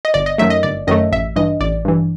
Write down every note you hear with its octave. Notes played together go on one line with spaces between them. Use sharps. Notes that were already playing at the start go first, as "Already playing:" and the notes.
D#5
G1 D5
D#5
F#2 D#3 F#3 A3 E5
D#5
G1 D5
F#2 D#3 F#3 A3 D#5
A1 E5
G2 E3 D#5
A1 D5
G2 E3